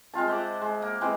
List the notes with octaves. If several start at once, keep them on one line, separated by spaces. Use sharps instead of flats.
G#3 C4 F4 A5
C5 E5 F#5 D6
G#3
A#3
E3 G#3 C4